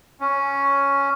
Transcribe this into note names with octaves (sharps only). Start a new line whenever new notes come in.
C#4